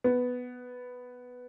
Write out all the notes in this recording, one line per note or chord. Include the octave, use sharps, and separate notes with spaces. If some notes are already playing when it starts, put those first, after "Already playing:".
B3